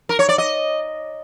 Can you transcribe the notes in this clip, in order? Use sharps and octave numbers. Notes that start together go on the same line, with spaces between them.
A#4
C#5
D5
D#5